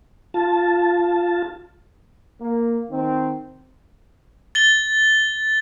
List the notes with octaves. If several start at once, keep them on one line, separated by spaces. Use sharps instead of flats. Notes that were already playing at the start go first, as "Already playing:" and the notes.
F4 A5
A#3
D#3 C4
A6 G7